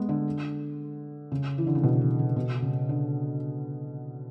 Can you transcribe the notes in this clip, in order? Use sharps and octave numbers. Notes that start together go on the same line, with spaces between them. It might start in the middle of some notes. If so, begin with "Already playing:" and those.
Already playing: G#3 B3
D3
C#3
E3
D3
C#3
B2
C#3
C#3
B2
C#3
D3